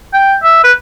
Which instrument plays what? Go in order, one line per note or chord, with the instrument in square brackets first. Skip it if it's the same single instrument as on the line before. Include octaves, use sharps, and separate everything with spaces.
[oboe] G5
E5
B4